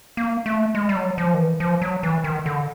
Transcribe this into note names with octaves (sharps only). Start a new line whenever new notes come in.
A#3
A3
G#3
G3
F#3
F3
D#3
E3
F3
F#3
E3
D#3
D3